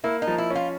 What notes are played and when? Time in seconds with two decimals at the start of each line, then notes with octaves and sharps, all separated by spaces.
0.04 A#3 E4
0.22 D#4
0.27 F3
0.38 E4
0.50 C#4 F4